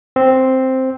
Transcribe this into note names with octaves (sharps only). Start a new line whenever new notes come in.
C4